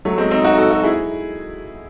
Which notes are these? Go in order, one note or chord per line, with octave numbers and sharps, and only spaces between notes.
F#3 A3
G#3 C4
C4 D#4
D#4 F#4
F#4 A4
F#4 A4
E4 G#4